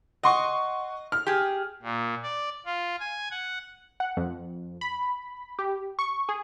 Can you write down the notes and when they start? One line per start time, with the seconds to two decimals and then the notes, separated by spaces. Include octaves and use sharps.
0.23 D#5 F#5 C6 C#6
1.12 F6
1.27 G4 G#4
1.83 A#2
2.23 D5
2.66 F4
3.00 G#5
3.31 F#5
4.00 F#5
4.17 F2
4.81 B5
5.59 G4
5.99 C#6
6.29 G#4